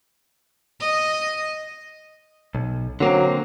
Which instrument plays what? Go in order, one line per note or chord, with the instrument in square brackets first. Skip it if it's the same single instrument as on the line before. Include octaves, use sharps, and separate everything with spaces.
[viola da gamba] D#5
[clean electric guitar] B1
[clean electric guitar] D3 A#3 C4 [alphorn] F#3